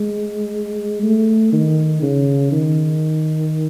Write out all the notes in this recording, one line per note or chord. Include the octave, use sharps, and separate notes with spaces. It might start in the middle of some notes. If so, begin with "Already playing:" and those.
Already playing: G#3
A3
D#3
C#3
D#3